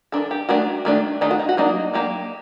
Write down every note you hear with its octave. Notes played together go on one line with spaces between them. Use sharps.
D#3 A3 D4 A4
G4
D#3 A3 D4 F#4
D#3 A3 D4
D#3 A3 D4 D#4
F#4
D#4
F#4
F#3 A#3 D4 D#4
F#3 A#3 D4 G4